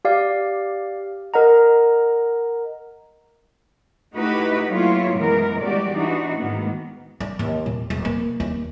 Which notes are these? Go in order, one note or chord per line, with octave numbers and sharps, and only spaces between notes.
G4 D5 F5
A#4 D#5 F#5 A#5
A3 D#4 E4 F#4 G4 B4
F#3 A3 A#3 E4 F4 C#5
F#2 B2 E3 G#3 B3 A#4
E2 G3 G#3 F#4 G4 D5
E3 D4 D#4 F#4
G#2 D#3 A#3 B3
D4
D#2
A#2
E1
A#3
D#2